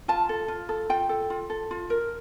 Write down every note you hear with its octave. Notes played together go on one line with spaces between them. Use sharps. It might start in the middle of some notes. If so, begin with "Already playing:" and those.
F4 A5
A4
F4
A4
F4 G5
A4
F4
A4
F4
A#4